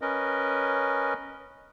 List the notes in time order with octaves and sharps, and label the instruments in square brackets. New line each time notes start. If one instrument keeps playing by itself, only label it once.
[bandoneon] C#4 A#4 B4 D#5